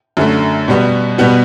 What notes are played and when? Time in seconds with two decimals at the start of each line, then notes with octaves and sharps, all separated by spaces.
0.17 F#2 D3 A3
0.68 B2 G3 B3
1.18 B2 G3 B3 F#4